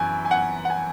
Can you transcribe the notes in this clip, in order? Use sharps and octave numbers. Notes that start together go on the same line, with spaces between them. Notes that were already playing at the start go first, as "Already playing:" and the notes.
Already playing: F#2 E3 G#5
G#5
F#5
F#5
G#5